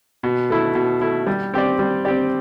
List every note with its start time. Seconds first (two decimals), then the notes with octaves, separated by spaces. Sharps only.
0.23 B2
0.50 A3 E4
0.75 B2
1.01 A3 E4
1.27 G3
1.54 C4 G4 D5
1.79 G3
2.05 C4 G4 D5